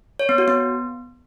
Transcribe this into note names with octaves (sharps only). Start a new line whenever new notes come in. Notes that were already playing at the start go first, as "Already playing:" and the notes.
C#5
B3
F#4
B3